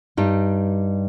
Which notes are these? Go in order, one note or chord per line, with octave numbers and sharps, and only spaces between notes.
G2 G3 D#4